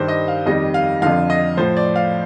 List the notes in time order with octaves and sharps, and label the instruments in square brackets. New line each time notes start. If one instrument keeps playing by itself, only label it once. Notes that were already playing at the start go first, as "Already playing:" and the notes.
Already playing: [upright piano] G2 D#3 G3 C5
D#5
F5
F2 D#3 G3 D#5
F5
F2 D3 F3 F5
D#5
A2 F3 C5
D5
F5